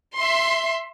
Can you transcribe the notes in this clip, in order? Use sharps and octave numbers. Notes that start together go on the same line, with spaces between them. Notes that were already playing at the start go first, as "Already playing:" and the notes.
E5 C6